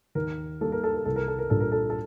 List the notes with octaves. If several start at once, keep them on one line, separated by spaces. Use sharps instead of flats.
D#2 A#4
D#3 G3 A#3 A4
A#4
A4
A#4
C2 A4
A#4
A4
A#4
A#2 G3 D4 A4
A#4
A4
A4